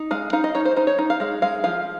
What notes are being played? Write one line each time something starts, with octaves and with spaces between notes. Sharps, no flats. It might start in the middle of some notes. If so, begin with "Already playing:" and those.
Already playing: D#4
G#3 F5
D#4 F5
D#5
D#4 C#5
C5
D#4 C5
C#5
D#4
F5
G#3 F5
G#3 F5
F3 F5